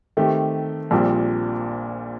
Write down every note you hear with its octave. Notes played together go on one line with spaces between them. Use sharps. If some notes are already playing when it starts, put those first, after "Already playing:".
D#3 A3 C4 G4
A#1 A#2 G3 C4